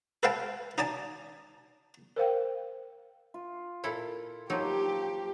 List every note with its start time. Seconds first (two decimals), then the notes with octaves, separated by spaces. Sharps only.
0.23 A4 B4 C5 F5 G5 A5
0.78 D#4 D5 G#5 A5
2.16 A#4 C5 F5 G5
3.34 F4
3.84 A#2 E4 A4
4.50 F3 F#3 A#3 D#4 G4 C5